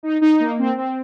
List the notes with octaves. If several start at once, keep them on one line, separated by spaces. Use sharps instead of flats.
D#4
D#4
A#3
C4
C4